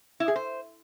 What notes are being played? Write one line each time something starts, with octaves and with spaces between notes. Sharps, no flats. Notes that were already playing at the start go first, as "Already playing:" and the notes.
E4
G#4
C5